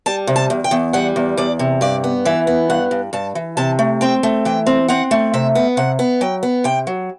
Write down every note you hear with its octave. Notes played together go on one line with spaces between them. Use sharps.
G3 A5
C3
A5
E2
G5
E2
G3 F#5
E2
E2 D5
C3
G2 D5
B3
E3 E5
B3
G2 F#5
G2
G2 A5
E3
C3 A5
A3
C4 G5
A3
E3 G5
C4
C4 F#5
A3
C3 E5
B3
C3 F#5
B3
F#3 G5
B3
C3 G5
F#3